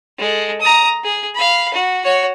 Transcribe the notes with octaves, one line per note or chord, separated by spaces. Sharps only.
G#3 A4
A#5 D#6
G#4
F5 B5
F#4
F#4 C#5